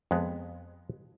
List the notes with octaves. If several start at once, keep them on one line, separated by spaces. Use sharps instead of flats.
F2 G#3 B3